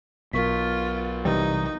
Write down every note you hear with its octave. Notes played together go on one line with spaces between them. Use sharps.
B1 B2 F4 A#4 C#6 B6
C3 E3 G3 D#4